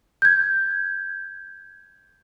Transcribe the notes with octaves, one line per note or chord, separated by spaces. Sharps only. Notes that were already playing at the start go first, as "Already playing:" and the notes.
G6 G#6